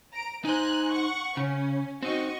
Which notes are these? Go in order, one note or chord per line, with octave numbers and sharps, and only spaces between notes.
A#5 D7
D#4 C5 G#5 A#5 F#6
F#5 C#6
C#3 C#4
C4 D#4 F#4 D#5 C#6